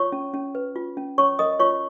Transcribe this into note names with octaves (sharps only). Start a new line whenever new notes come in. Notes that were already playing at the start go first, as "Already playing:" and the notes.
Already playing: F4 C#5 C#6
C#4
C#4
B4
F4
C#4
C#4 C#5 C#6
A#4 D#5 D#6
F4 C#5 C#6